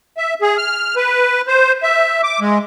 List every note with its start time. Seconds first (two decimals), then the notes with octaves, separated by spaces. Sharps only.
0.17 E5
0.41 G#4
0.57 F6
0.96 B4
1.47 C5
1.83 E5
2.23 D6
2.40 G#3